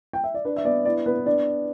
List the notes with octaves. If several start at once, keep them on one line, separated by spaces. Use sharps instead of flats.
G5
E5
D5
D4 B4
E5
B3 D5
E4 D5
B3 B4
D4 D5